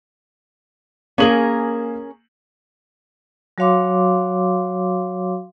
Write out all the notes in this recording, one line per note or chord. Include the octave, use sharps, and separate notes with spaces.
A#3 C#4 G#4 A#4 F#7
F#3 F#4 C#5 F5 C6 D6